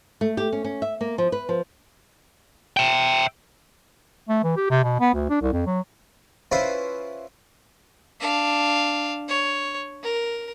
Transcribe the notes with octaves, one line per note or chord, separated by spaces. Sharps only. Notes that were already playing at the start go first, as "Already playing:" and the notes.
A3
G4
C#4
C#4
E5
A#3
F3
B4
F3
E5 G5
A3
E3
G4
C3
B2
B3
D2
D4
C2
F2
F#3
C#4 E4 F4 B4 C5
D4 F5
C#5
A#4